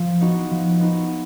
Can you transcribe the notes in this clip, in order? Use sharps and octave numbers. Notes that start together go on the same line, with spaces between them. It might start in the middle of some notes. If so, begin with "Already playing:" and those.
Already playing: F3
B3 D#4 F#4
F3
B3 D#4 F#4